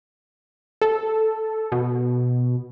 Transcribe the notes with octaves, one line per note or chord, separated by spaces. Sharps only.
A4
B2